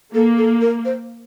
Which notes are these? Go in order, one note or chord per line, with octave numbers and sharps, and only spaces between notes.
A#3 A4
A4
A#4
C5